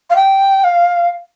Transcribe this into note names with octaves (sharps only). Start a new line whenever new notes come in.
F5
G5
F5